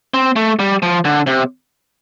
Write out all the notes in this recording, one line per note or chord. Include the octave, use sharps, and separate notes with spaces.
C4
A3
G3
F3
D3
C3